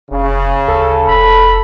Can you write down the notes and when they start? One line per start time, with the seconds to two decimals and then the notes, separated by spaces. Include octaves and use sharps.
0.11 F1 C#3
0.68 D2 A4
1.08 F1 B5